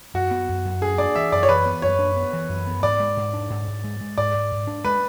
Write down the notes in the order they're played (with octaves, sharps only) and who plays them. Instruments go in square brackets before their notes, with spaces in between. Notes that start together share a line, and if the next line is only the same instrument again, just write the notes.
[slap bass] F#2 [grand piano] F#4
[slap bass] B3
F#2
F#2
[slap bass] D4 [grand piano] G#4
[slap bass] D4 [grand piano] D5
[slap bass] E3 [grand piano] E5
[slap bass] F#2 [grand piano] D5
[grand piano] C#5
[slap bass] E3 [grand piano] B4
[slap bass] B3
[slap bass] F#2 [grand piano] C#5
[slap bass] D4
B3
E3
F#2
B3
[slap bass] G#2 [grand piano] D5
[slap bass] G#3
G#2
D4
G#2
G#2
G#3
G#3
[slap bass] G#2 [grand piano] D5
[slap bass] G#2
G#2
D4
[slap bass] G#3 [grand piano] B4